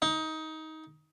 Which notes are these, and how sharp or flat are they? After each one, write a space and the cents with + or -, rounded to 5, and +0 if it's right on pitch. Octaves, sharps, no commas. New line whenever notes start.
D#4 +20